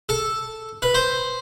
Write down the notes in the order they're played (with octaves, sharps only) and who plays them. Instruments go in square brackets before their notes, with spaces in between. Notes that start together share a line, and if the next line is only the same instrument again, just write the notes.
[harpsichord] A4
B4
C5